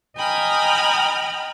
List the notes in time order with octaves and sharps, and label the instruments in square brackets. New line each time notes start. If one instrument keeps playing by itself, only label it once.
[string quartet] D#5 G5 G#5 A#5 B5 F6